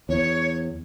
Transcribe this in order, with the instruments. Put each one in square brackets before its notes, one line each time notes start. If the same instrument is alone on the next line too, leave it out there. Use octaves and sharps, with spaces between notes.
[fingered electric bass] E2 [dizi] C#5